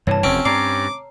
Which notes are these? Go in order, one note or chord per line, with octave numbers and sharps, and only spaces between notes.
G2 C3 E3 C#5 A5
F1 E2 C4 C#4 D7
G2 A#5 D6 C7